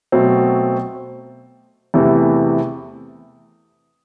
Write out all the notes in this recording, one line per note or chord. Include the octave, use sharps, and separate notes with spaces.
B2 F#3 A3 C4
E2 C3 E3 A3